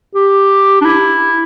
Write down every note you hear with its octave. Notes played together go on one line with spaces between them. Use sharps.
G4
D4
E4